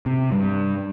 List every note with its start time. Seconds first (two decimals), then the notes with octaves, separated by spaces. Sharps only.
0.06 C3
0.32 G2